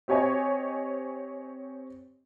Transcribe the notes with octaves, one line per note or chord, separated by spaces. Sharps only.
C4 G4 C#5 D#5 G#5